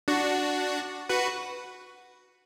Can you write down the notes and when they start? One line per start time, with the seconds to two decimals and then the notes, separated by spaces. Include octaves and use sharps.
0.08 D4 F#4
1.09 F#4 B4